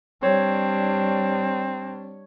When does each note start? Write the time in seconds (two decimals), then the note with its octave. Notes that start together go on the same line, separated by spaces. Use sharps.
0.23 G3 C4 D4 C#5